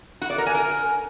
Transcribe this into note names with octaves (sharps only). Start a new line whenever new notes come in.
F#4
D5
A#4
G#5
A#4